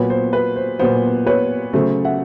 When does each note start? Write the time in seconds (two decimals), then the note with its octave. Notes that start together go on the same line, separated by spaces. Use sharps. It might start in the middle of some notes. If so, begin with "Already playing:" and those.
Already playing: A#2 F#3 B3 B4 C#5
0.10 C5
0.33 B4
0.56 C5
0.79 A#2 F#3 B3 C5
1.26 B4 C#5
1.73 C#3 F#3 A3 C5
2.05 E5 F#5